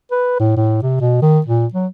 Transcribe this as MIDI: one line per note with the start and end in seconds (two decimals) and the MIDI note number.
0.12 0.37 71
0.40 0.55 45
0.57 0.80 45
0.82 1.00 48
1.01 1.19 47
1.22 1.40 51
1.46 1.66 46
1.74 1.87 54